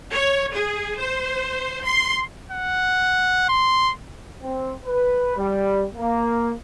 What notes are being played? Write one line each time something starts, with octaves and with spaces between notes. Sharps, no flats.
C#5
G#4
C5
C6
F#5
C6
C4
B4
G3
A#3